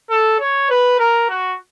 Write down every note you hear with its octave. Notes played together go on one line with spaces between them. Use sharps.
A4
C#5
B4
A#4
F#4